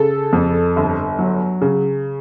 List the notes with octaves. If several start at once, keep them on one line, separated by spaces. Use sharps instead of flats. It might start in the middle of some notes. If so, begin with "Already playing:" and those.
Already playing: C#3 A4
F2
G1
F#3
C#3